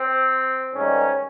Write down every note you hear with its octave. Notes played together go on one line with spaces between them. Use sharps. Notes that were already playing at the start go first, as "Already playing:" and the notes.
Already playing: C4
G#2 D#3 G3 A#3 C#4